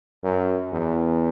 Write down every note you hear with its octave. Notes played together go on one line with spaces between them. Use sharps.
F#2
E2